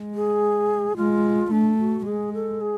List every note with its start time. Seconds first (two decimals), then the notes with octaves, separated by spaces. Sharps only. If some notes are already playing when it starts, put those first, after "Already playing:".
Already playing: G#3
0.15 G#4
0.96 G#3 F4
1.51 A3 D4
1.79 F#4
2.06 G#3 G#4
2.34 A4
2.61 G#4